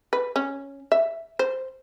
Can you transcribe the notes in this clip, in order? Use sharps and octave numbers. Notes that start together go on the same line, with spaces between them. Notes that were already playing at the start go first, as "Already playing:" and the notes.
B4
C#4
E5
C5